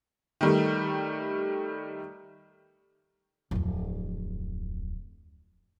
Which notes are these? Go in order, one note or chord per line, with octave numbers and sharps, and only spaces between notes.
D#3 G3 A3
D1 F2